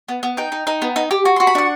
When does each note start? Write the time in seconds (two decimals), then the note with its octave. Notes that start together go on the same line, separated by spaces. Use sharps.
0.08 B3
0.23 B3
0.37 D#4 G5
0.52 D#4
0.67 D#4
0.82 B3
0.96 D#4
1.11 G4
1.25 F#4
1.36 F#4 C6
1.47 B5
1.55 D4 F#5